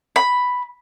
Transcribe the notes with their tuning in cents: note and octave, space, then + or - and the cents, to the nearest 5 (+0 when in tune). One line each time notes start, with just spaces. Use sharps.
B5 +0